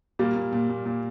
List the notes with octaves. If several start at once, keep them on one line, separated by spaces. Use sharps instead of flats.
A#2 G3 A#3
A#2
A#2
A#2
A#2